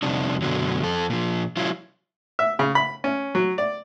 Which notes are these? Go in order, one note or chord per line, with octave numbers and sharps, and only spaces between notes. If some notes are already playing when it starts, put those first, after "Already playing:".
F2 C3 G3 C4 D4 D#4
F#2 B2 D3 F#3
F2 A4
A#2 F3
F#3 C#4 E4 F4
E5
C#3
B5
C#4
F#3
D5